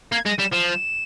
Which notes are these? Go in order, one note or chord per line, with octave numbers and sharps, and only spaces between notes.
A#3 G#6
G#3 A#6
G3 E7
F3 E7
E7